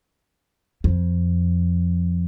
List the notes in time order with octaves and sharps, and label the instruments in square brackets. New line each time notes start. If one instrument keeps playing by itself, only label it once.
[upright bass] F2